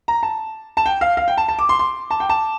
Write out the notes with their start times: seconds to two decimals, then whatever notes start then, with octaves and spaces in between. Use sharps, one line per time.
0.08 A#5
0.23 A5
0.77 A5
0.86 G5
1.01 F5
1.17 F5
1.28 G5
1.37 A5
1.48 A5
1.59 D6
1.69 C6
1.79 C6
2.10 A5
2.20 G5
2.29 A5